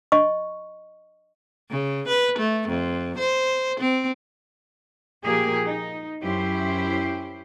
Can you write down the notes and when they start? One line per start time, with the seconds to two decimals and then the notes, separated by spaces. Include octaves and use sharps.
0.12 D#5 C#6
1.70 C#3
2.08 B4
2.39 A3
2.68 F2
3.18 C5
3.79 C4
5.23 A#2 F3 A#3 G4 G#4
5.65 D#4
6.23 F#2 C#4 E4 G4 C5